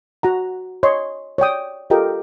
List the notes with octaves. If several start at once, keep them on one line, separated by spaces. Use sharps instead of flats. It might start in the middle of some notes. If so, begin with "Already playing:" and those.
F#4 F#5 A#5
C#5 D#5 C6
C#5 D5 G5 D#6
F4 G4 A4 A#4 D#5 G5